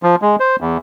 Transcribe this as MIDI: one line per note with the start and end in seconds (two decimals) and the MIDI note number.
0.03 0.16 53
0.22 0.36 56
0.40 0.56 72
0.60 0.77 40